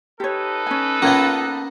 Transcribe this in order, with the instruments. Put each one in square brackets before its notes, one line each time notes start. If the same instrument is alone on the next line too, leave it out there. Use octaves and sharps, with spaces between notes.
[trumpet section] D#4 A4 B4 [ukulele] G4 C#5
[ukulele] C#4 G#5
[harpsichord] A#3 B3 [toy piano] C#4 [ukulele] F4 C#5 F5